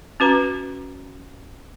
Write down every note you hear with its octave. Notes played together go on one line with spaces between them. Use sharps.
C#4 F#4 B4 A#5